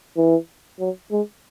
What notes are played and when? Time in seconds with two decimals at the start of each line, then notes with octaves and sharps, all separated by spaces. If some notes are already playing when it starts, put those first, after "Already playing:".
0.17 E3
0.80 F#3
1.12 G#3